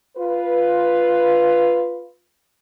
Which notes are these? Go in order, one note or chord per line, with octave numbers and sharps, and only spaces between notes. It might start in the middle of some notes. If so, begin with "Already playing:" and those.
F4 B4